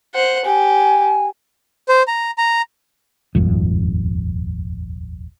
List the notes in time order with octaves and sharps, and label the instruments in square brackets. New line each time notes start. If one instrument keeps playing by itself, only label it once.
[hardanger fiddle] C5 F#5
[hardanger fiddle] G4 [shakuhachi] G#5
[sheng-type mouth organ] C5
A#5
A#5
[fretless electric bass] D#1 G#1 F2